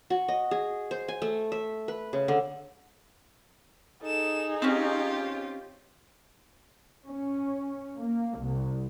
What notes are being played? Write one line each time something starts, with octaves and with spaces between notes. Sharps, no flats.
F#4
D#5
G#4
C5
G#5
A3
E5
B4
C#3
D3
D#4 G#4 A4 E7
C4 C#4 F4 G4
C#4
A#3
C2